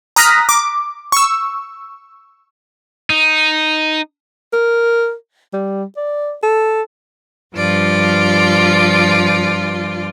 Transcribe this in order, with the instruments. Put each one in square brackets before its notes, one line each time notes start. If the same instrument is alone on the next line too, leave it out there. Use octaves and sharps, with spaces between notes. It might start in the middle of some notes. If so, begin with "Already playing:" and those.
[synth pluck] A#5 D#6 F6 F#6 A#6 B6
D6
C#6 E6
[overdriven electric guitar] D#4
[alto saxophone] A#4
G3
D5
A4
[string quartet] G2 F3 F4 D5